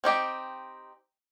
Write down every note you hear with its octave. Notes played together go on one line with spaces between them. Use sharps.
C4 D#4 G4